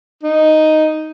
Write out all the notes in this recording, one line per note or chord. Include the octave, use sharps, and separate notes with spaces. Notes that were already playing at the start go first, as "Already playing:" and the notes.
D#4